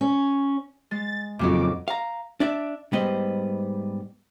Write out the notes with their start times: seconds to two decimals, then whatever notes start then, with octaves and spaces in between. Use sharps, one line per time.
0.01 C#4
0.91 G#3 A6
1.39 F2 A#2 C#3 F#3 D#4 D6
1.88 F5 A#5
2.40 D4 D5 E5
2.93 G#2 G3 B3 C5 D#5